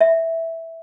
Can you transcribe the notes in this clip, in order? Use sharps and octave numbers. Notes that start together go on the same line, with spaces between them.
E5